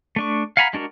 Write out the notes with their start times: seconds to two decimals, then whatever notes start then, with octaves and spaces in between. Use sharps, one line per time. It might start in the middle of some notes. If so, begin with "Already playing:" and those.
0.16 A3 D4 C#6
0.57 F5 F#5 G#5 A#5 B5
0.73 G#3 D4 F#4 A#4